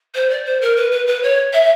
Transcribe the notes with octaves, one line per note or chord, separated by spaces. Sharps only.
C5
D5
C5
A#4
B4
B4
B4
C#5
E5